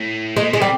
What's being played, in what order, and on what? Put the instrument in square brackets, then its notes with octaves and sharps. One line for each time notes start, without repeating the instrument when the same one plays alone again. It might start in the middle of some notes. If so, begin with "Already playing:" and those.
Already playing: [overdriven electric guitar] A2
[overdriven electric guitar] A#2 [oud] G#3
[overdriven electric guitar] C3 [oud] G#3
[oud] G3